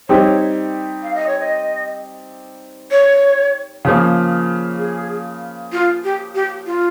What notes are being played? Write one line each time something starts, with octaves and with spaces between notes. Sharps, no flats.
G3 C4 D#4 G4 C#5
F5
D#5
C#5
D#5
C#5
C#3 F3 A#3
G#4
F4
G4
G4
F4